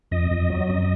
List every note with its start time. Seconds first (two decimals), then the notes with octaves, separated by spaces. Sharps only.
0.11 F2 D#5
0.31 F2
0.50 F#3
0.69 F#2